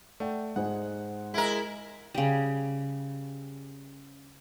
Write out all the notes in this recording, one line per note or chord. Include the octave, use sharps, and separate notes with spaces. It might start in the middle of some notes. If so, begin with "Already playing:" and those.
A3 D5 F#5 G5
G#2 G#4 C5 F#5
G#3 E4 A#4
C#3 G3